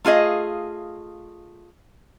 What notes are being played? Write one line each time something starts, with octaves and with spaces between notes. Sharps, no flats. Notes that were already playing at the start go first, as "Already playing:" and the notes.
A3 F4 G#4 D#5 F5